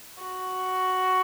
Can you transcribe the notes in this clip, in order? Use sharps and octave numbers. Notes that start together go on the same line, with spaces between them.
F#4